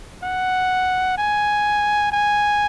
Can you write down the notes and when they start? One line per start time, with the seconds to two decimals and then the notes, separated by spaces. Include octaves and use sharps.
0.23 F#5
1.18 G#5
2.12 G#5